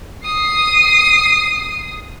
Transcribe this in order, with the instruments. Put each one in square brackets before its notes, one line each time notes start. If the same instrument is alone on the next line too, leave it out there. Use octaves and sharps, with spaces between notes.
[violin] D#6 C7